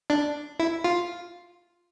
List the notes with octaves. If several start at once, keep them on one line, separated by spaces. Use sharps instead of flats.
D4
E4
F4